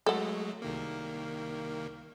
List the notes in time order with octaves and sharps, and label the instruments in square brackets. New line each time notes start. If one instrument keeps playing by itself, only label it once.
[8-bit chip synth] F#3 G#3 A3 [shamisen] A4 F#5
[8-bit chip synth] C2 D#3 A#3